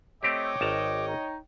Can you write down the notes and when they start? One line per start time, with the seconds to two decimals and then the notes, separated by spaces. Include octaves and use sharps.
0.23 A3 C4 G4 C#5 D#5 G5 D6
0.61 G#1 A5 A#5
1.07 D#4